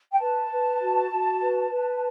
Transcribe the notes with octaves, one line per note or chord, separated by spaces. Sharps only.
G5
B4 A5
B4
F#4
F#4
B4
B4